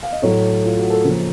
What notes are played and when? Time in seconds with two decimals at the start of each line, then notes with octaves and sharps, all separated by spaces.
0.03 F5
0.12 D#5
0.22 A2 F#3 A3 C#5
0.66 F4
0.79 F#4
0.90 A4
1.03 C#3 F3 A#3 C#4 A#4